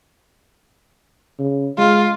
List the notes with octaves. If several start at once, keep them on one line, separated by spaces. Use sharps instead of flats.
C#3
G#3 F4